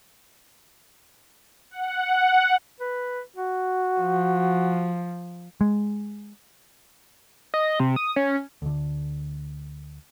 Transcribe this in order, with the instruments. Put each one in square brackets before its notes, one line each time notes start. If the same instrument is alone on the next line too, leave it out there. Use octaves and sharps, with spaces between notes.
[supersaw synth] F#5
[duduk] B4
F#4
[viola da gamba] F3
[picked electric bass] G#3
[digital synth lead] D#5
C3
D#6
C#4
[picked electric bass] D2 D3